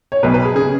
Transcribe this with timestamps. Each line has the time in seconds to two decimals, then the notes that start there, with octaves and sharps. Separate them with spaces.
0.12 C#5
0.23 B1 B2 B4
0.34 B4
0.45 G#4
0.56 C#3 G#4